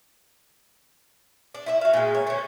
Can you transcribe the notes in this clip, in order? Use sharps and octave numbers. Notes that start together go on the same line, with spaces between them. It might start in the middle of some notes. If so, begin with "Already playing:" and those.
D4
E4 F4 E5
F#4 F5
A#2 G#3
C#5
D3 C#4